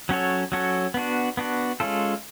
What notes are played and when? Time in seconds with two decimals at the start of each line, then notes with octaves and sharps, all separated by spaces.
0.09 F#3 C#4 F#4 A4 C#5
0.52 F#3 C#4 F#4 A4 C#5
0.94 B3 D4 F#4
1.37 B3 D4 F#4
1.80 G#3 C#4 F4 A4